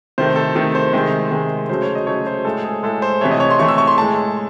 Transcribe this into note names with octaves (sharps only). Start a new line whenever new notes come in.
C3 D#3 A3 C5
A4
C3 D#3 A3 A4
C5
C3 D#3 G#3
C3 D#3 G#3
C#3 F#3 A3 C5
C#5
D#5
C#3 F#3 A3 C#5
C5
A2 G#3 A4
G#4
A2 G#3 A4
C5
C3 E3 A3 C#5
D#5
C#5
C6
C3 E3 A3 C#6
E6
C#6
C6
A2 G#3 A5